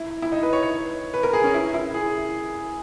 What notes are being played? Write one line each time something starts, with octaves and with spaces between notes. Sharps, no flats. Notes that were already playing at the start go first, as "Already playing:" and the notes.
Already playing: E4
E4
D#4
B4
C#5
C#5
B4
A#4
G#4
C#4
E4
E4
G#4